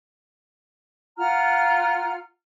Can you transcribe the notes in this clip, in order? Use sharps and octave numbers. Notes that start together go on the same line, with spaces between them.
F4 F#5 A#5 F6